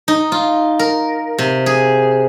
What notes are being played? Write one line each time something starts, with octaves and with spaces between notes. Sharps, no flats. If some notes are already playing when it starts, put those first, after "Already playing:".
D#4
F4
A#4
C3
G#4